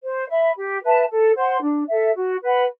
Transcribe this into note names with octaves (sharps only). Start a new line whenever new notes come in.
C5
E5 B5
G4
B4 E5 A5
A4
C5 F#5 C6
D4
A4 E5
F#4
B4 F#5 B5